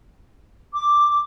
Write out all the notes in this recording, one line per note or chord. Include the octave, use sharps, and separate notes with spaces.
D6